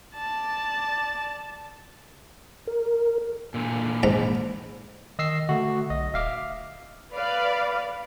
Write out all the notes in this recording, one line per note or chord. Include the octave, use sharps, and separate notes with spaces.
D5 A5
A#4
A#2 D3 E3
G#2 A#5
D#3 D#5 E6 C7
D3 A3 F#4
B1 D#5
D#1 E5 F5 D6
B4 D5 F5